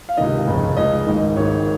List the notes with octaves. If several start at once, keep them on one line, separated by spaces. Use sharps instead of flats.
F5
C#2 C3 D#3 D#5
F1 D#2 C#3
C#2 C#3 D#5
G#1 G#2 D#3
G#1 G#2 D#3 C#5